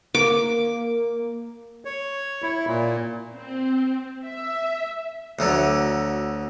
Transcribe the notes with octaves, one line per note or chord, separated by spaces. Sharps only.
A#3 D6
C#5
E4
A#2
C4
E5
D2 D3 F#3